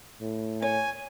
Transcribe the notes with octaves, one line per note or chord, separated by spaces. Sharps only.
A2
C#5 G#5